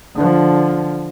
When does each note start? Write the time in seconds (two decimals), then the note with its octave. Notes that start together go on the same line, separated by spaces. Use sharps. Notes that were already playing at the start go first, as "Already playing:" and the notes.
0.15 D3 F3